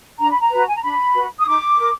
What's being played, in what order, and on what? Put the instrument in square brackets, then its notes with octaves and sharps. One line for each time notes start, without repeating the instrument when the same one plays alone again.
[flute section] D4 A#5
B5
A#5
F#4 B4
G#5
A#5
D4 B5
F#4 B4
D#6
D#4 D6
A#4